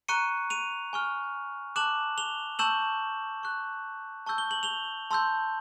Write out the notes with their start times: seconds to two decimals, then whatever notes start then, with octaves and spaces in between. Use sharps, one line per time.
0.08 A#5 C#6 F#6 C#7 D#7
0.50 D#7 F7
0.93 G#5 C#6 F6
1.76 A5 D6 F#6 E7 F#7
2.18 F7 G7
2.59 A5 C#6 E6 G6 E7 F#7
3.43 C#6 F#6
4.26 A5 C#6 E6 G6
4.38 G7
4.51 F#7
4.63 F7 G7
5.11 A5 C6 E6 G6